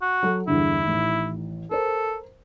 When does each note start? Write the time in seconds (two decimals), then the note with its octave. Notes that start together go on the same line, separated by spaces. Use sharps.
0.02 F#4
0.23 F#3 A4
0.47 E2 G2 D3 E4
0.83 A1 D#3
1.71 A4 A#4 C5